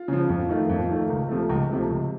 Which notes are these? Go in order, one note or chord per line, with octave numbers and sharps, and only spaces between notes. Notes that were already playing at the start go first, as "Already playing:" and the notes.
Already playing: F4
C#3 F3
F2
D#3 A3
F2
D#3 A3
C#2
C3 F3 A3
C#2
C3 F3 A3
C#2